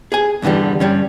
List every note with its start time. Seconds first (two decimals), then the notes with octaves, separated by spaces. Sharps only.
0.12 G#4 G#5
0.42 E2 G2 D3 E3 G3
0.80 G2 G3 C#4